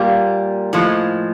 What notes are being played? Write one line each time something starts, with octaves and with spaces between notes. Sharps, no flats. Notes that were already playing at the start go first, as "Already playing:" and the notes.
Already playing: A#2 G3 A#3
A2 F3 G#3